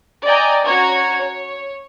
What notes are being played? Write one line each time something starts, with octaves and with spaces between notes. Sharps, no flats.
D5 D#5 G5 G#5 A#5
C#4 F#4 C#5 A#5 C#6 G#6
C#5